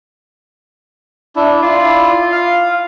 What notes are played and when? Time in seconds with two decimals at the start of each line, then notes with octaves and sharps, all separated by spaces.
1.36 D4 E4
1.63 E4 F4 D5
2.32 F5